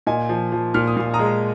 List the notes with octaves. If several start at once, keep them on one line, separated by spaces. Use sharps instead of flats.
A#2 D#5 G#5
F3
F3
A#2 F6
D#6
A#2 C6
A#5 D#6
G#3